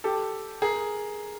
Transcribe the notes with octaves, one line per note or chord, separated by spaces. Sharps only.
G4 A4
G#4 A#4